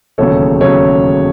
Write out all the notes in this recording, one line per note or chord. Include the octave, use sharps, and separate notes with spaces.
E1 D#2 C#3 F#3 A4 C#5
C#3 F#3 A4 C#5